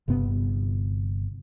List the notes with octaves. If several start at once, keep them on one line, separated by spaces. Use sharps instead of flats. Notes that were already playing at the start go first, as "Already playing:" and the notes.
G1 G2 C3 B3